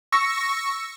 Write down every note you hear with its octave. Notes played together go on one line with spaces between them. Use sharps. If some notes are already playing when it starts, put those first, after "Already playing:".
C#6 E6 A#6 C#7